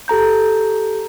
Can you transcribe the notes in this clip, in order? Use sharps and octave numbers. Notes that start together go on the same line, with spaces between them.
G4 A4 A#5 G6